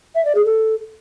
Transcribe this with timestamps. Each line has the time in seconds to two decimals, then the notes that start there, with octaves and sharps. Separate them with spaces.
0.15 E5
0.25 D5
0.35 G#4
0.45 A4